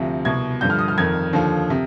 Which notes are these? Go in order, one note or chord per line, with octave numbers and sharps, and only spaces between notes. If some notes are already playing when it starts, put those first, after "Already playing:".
Already playing: D2 C3 F3
C2 B2 G#6
G2 D3 F3 G6
F6
D#6
F6
F2 D#3 G#6
D#2 D3 F3
C3